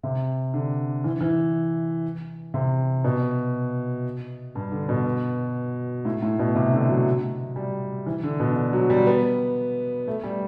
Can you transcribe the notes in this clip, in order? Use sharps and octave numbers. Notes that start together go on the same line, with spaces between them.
C3
D3
E3
E3
C3
B2
G2
D3
B2
A2
A2
B2
C3
D3
F#3
G3
E3
D3
B2
D3
F#3
G3
B3
A3
G3